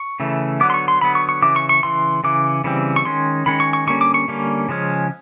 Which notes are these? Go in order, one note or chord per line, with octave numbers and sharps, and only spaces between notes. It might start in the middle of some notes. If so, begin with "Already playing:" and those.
Already playing: C#6
C#3 E3 A3
D3 F#3 B3 D6
C6
C#6
C6
D3 F#3 B3 B5
C#6
C#6
C#3 E3 D6
C#6
C#6
C#3 E3 C6
C#3 E3 D6
C#3 E3 G3 C4
C#6
D#3 G#3 C#4 C6
D#3 G#3 C#4 B5
C#6
C#6
D3 G3 A#3 C#4 C#6
D6
C#6
D3 G3 A#3 C#4
C#3 F3 G#3 C#4